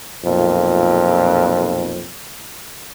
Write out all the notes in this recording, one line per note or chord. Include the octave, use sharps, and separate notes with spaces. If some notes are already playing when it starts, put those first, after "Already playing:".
B1 F2 A#2